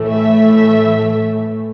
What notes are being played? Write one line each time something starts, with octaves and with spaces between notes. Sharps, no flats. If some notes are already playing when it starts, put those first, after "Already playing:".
Already playing: A2 E3 A3
E5